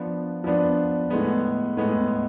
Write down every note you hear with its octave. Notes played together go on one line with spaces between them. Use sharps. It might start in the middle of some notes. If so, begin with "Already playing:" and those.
Already playing: F3 B3 D4
F3 B3 D4
A2 G#3 B3
A2 G#3 B3